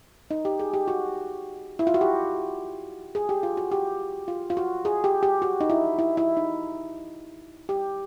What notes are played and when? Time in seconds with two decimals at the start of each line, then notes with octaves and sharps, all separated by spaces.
0.31 D#4
0.45 G4
0.59 G#4
0.74 G4
0.88 F#4
1.79 E4
1.87 F4
1.94 F#4
2.01 G4
3.15 G#4
3.29 G4
3.43 F4
3.57 F#4
3.72 G4
4.28 F4
4.50 F4
4.57 F#4
4.85 G#4
5.04 G4
5.23 G4
5.42 F#4
5.61 D#4
5.70 E4
5.99 E4
6.17 E4
6.37 D#4
7.69 G4